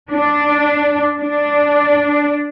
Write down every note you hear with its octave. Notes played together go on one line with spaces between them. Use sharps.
D4
D4